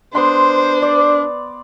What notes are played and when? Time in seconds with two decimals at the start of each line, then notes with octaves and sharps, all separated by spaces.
0.15 B3 D4 C5 C6
0.82 D5